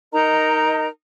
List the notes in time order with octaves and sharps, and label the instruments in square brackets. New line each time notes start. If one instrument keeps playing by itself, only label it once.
[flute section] D#4 A#4 D#5 A#5